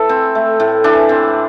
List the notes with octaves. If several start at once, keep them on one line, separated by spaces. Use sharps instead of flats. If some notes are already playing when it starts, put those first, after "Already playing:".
Already playing: E3 A3 A4
C4
A3
A2
E3 D4
C4